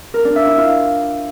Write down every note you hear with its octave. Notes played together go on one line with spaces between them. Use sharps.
A#4
D4
E5
E4
F4